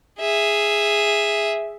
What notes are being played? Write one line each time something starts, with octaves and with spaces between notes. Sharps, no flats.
G#4 E5